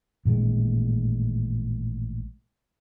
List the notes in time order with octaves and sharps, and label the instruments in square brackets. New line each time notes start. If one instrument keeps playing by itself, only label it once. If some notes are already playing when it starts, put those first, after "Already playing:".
[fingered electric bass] A1 A#2 D#3 G#3